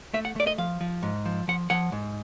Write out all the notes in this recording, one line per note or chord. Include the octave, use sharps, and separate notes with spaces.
A3 E5
F#5
A3 D5
D#5
F3 F5
F3
G#2
F3
F3 F#5
F3 F#5
G#2